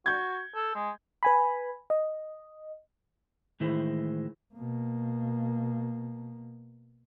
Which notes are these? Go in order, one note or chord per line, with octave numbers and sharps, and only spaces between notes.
F#4 G6 G#6
A4
G#3
B4 G#5 B5
D#5
A2 D#3 E3 G#3 E4 C5
B2 A#3